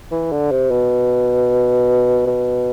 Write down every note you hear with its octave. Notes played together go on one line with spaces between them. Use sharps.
E3
D3
C3
B2
B2